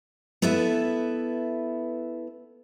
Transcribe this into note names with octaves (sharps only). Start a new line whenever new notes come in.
B3 E4 A4 B4 E5